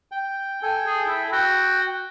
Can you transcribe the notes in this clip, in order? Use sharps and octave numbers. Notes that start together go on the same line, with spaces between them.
G5
A4 G5 G#5
G#4
E4
F#4 G5